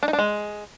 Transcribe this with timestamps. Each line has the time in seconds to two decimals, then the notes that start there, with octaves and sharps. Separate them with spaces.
0.03 D4
0.08 D#4
0.13 D4
0.19 G#3